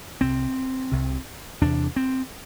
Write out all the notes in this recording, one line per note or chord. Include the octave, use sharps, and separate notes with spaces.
C2 C3 C4
C2 C3
E2 C3 D4
C4